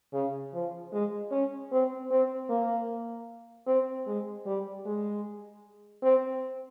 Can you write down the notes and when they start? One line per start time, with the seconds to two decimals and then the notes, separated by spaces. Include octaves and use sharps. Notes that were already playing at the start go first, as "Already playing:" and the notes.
0.13 C#3
0.54 F3
0.92 G#3
1.31 C#4
1.72 C4
2.11 C4
2.50 A#3
3.67 C4
4.07 G#3
4.46 G3
4.86 G#3
6.03 C4